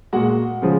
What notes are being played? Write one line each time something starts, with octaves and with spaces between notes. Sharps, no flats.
A#2 G#3 F#4 F#5
C#3 F3 G#3